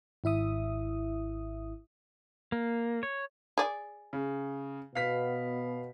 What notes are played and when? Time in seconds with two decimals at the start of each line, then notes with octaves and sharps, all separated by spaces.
0.24 G#1 E4 E5 D#6
2.52 A#3
3.03 C#5
3.58 G#4 D5
4.13 C#3
4.95 B2 B3 F5 B6